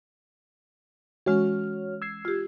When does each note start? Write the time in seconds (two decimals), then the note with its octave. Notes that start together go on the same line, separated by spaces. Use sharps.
1.26 E3 G#3 C#4 F#4 C#5 F6
2.02 E6 G#6 C7
2.25 F4 G4